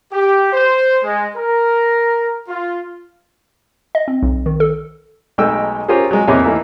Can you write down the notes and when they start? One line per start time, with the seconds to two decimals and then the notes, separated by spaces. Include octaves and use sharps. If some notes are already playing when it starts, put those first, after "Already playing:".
0.12 G4
0.53 C5
1.03 G#3
1.35 A#4
2.48 F4
3.95 D#5
4.08 C4
4.23 B1
4.46 D#3
4.60 A4
5.38 B1 G#3 A3 D#4 G5 E6
5.88 C#4 F4 G4 G#4 A#4 C5
6.11 F#3 G#3
6.27 E2 C3 A#3 D#4 C#5 G#5
6.44 D#2 E3 A3 A#3 E5